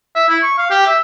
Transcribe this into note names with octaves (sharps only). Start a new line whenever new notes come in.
E5
E4
C#6
F5
G4
E5